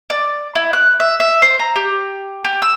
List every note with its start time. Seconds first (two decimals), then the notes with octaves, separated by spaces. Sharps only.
0.10 D5
0.55 E4
0.73 F#6
1.00 E5
1.20 E5
1.42 C5
1.59 A#5
1.76 G4
2.44 G4
2.62 E6